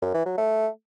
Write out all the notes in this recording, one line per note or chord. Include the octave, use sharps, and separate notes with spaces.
F#2
E3
F#3
A3